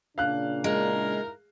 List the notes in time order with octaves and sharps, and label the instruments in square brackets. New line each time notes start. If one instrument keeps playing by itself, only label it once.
[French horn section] A#2 C#3 D4 [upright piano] F5 F#6
[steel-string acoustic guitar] G#3 [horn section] D#4 E4 A#4